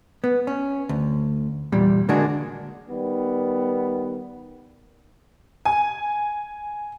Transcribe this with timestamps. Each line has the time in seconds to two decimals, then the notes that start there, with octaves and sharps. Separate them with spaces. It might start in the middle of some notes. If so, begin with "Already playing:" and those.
0.24 B3
0.47 C#4
0.89 D2
1.72 E2 A#2 G3
2.09 D3 G#3 A#3 D4 F#4 G#4
2.88 D#3 G3 B3
5.65 G#5